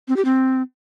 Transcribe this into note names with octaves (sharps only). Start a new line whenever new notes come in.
C4
G4
C4